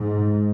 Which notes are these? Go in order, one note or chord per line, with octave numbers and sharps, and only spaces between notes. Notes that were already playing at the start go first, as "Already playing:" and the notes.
Already playing: G#2